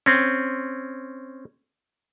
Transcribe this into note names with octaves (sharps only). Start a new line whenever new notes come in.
C4 C#4